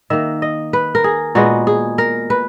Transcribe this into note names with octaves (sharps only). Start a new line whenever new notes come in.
D#3 A#3 E5
D#5
B4
A#4
G#4
A#2 G#3 B3 F#4
G#4
A#4
B4